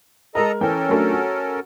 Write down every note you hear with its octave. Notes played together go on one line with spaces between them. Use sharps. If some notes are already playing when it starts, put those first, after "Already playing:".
G#3 A4 A#4 D#5 A#5
E3 C#4 A4 A#4 G5
F#3 A3 D4
F#4